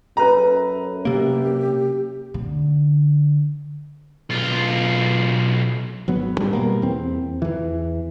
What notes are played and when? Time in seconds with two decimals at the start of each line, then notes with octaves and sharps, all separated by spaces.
0.17 F#2 A4 B4 A#5
1.05 C3 A#3 G4
2.34 D3
4.30 B1 F4
6.08 G#1 F#3 B3
6.38 G#2 G3
6.53 B2 G3 A#3 B3
6.82 E2 C4
7.42 E2 E3